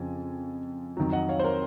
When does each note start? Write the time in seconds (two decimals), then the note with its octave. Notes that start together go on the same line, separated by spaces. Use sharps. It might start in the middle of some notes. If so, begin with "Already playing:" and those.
Already playing: F2 C#3 F3 G#5
0.97 F2 D#3 F#3
1.12 D#5 F#5
1.29 C#5 F5
1.40 C5
1.44 A#4 C#5